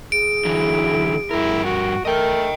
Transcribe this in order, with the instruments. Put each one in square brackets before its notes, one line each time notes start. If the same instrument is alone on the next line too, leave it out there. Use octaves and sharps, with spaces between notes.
[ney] G#4 [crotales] D7
[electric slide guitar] D3 E3 F#3 [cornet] E4
[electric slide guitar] G2 A#4 [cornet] E4
[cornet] F#4
[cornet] A3 [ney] A#4 [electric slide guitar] D#5 G5